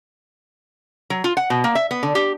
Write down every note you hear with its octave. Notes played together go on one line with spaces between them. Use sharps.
F#3
F4
F#5
B2
A#3
E5
B3
D3
G4